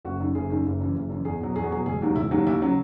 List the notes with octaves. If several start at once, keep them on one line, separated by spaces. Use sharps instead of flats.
F#1 F#4
F#2 D#3
F#1 G#4
F#2 D#3
F#1
F#2 E3
F#1
F#2 E3
E2 G#4
B2 F#3
E2 G#4
F#4
B2 F#3 G#4
E1 G#4
D#2 D#3 F#3
E1 E4
D#2 D#3 F#3
D#2 E4
C#3 F#3